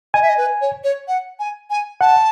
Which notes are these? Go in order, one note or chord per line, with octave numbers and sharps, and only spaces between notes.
D#5 G#5
E5
D#5
B4
C#5
C#5
F#5
G#5
G#5
F#5 A5